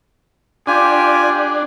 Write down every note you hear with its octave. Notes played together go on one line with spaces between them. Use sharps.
D4 F4 G4 G#5